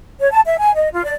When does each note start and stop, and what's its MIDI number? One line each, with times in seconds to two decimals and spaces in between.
0.19 0.29 73
0.31 0.40 81
0.45 0.57 76
0.59 0.71 80
0.76 0.88 75
0.91 1.03 65
1.03 1.14 74